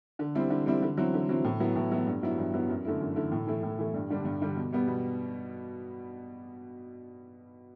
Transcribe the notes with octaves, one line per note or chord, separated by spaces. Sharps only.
D3
G3 C4 E4
D3
G3 C4 E4
D3
F#3 C4 E4
D3
F#3 C4 E4
A2
F#3 B3 E4
A2
F#3 B3 E4
G2
F#3 B3 E4
G2
F#3 B3 E4
F#2
D3 A3 E4
F#2
D3 A3 E4
A2
E3 A3 E4
A2
E3 A3 E4
G2
D3 G3 D4
G2
D3 G3 D4
B2
G3 B3
B2